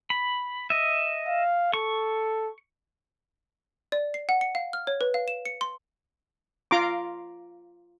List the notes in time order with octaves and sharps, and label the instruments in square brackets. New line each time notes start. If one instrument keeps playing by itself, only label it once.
[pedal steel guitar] B5
D#5 E5
[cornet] F5
[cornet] A4 [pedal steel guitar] C#6
[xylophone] D5
C7
F#5
C#7
F5
F6
C#5
B4
F5
E7
C#7
C6
[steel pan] F4 A#5 C6 D6